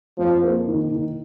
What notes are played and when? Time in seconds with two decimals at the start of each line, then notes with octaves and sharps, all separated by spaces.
0.17 F2 F3
0.43 A#3
0.68 D#3
0.92 D#3